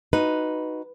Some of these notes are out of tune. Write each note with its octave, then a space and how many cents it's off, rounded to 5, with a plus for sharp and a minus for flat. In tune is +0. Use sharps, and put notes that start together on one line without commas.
D#4 +0 F#4 +0 B4 +0